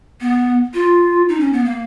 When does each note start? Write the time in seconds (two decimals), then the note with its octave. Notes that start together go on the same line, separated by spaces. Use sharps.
0.21 B3
0.74 F4
1.29 D#4
1.40 C#4
1.53 B3
1.64 A#3